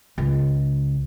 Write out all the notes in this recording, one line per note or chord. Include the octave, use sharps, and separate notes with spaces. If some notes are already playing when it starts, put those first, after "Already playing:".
C#2